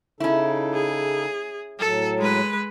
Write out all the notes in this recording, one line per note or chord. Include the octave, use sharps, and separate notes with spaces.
C#3 C#4 D#4 E4 A4
G#4
A2 F#3 A4
G#3 B4